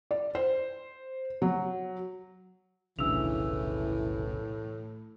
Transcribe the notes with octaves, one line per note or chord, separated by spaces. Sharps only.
D5
C5
F#3
F1 B1 A2 C#3 E3 D4 E6 F7